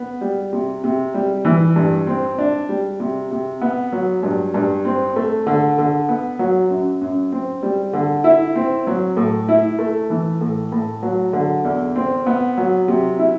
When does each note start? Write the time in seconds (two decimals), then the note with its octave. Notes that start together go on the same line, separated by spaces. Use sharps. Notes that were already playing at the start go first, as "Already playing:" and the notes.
Already playing: B3
0.21 G3
0.53 C3
0.84 C3
1.14 G3
1.45 E3
1.76 G2
2.07 C4
2.39 D4
2.69 G3
3.00 C3
3.31 C3
3.62 B3
3.92 F#3
4.23 G2
4.54 G2
4.85 C4
5.16 A3
5.47 D3
5.78 D3
6.09 B3
6.39 F#3
6.71 F#2
7.01 F#2
7.32 C4
7.63 G3
7.93 D3
8.24 E4
8.56 C4
8.87 F#3
9.17 A2
9.49 E4
9.79 A3
10.10 E3
10.41 A2
10.72 A2
11.03 F#3
11.33 D3
11.65 E2
11.96 C4
12.27 B3
12.58 F#3
12.88 C3
13.19 E4